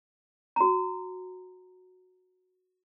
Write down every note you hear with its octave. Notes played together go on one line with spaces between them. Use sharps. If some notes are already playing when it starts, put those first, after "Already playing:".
F#4 A#5